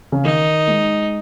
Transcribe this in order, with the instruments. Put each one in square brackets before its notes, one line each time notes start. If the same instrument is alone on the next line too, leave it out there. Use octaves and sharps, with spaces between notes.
[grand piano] C#3
[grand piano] D#3 [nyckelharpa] D#4
[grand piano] G#3